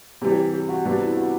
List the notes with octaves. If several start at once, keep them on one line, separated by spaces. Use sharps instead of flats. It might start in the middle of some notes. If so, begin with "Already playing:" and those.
C3 E3 G3 G4
G4
G4
F#4
C3 G3 B3 D4 F#4
E4
F#4